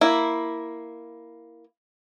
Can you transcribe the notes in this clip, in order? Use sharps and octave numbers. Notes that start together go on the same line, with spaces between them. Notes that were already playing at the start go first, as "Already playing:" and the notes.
A#3 E4